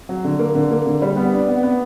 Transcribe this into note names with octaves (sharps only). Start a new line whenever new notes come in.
F#3
D3
A#3
D3
A#3
D3
G3
B3
D4
B3
B3